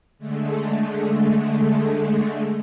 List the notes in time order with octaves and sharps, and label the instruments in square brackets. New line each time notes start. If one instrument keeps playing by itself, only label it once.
[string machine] D3 G#3 A3